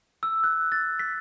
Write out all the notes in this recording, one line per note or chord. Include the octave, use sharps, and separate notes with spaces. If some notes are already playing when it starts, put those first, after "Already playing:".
E6
F#6
A6
B6